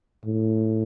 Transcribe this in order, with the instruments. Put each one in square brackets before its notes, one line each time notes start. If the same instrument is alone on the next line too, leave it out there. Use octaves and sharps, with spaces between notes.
[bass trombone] A2